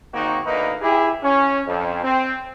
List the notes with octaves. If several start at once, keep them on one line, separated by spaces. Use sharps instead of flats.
G#1 D#3 A#3 C4 D#4 F#4
D2 A#3 D#4 B4
E4 G4 G#4
C#4
F2
C4